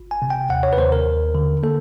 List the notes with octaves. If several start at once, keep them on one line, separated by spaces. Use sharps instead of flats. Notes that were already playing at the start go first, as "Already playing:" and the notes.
Already playing: G1
G#5
C3
G5
D#2 F#5
C#5
B4
D#2 C5
A#4
D#2
D3
A#3 A4